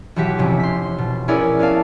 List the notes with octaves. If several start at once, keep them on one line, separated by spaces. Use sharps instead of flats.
B1 E3 F#4 G4 B6
F1 C3 C#4
C6 B6
B2
C#4 E4 G#4 A#4 B4 D5
B3 C#4 D5 F5 A5